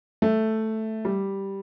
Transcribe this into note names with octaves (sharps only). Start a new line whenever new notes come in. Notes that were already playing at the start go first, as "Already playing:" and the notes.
A3
G3